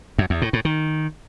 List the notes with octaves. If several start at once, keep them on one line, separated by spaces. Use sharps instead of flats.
F#2
E2
A2
A2
D#3